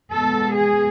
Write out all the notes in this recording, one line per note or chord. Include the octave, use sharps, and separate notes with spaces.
B2 G#3 B3 A4
G#4